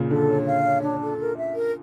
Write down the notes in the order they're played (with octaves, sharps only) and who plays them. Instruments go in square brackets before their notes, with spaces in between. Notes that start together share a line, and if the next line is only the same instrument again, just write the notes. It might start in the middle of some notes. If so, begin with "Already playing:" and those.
Already playing: [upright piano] A#2 C#3
[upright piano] D3 [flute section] A4
[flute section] C#5
F5
C#5
D4
A4
A#4
E5
A#4